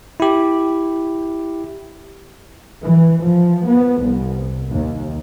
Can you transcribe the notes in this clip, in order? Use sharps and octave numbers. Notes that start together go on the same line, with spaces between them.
E4 G4
E3
F3
B3
C2
D#2